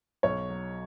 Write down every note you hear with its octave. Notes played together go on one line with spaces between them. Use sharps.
B1 C#5
F#3